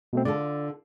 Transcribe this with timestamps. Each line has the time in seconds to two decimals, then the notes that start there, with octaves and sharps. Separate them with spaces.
0.13 B2 A3 C4
0.25 D3 F4 A4 D5